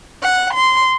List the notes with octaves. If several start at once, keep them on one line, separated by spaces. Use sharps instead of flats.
F#5
C6